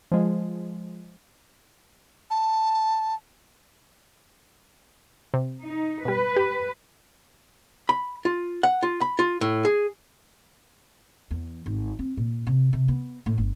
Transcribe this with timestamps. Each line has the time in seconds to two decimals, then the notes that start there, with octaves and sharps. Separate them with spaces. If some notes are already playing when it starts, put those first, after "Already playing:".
0.12 F3 G#3
2.30 A5
5.34 C3
5.64 D#4
6.05 B2 G3 B4
6.36 G4
7.89 B5
8.25 F4
8.63 F#5
8.83 F4
9.01 B5
9.19 F4
9.41 A2
9.65 G#4
11.31 E2
11.66 G#1
11.99 C4
12.17 A#2
12.47 C3
12.73 C3
12.88 B3
13.26 A2
13.38 G1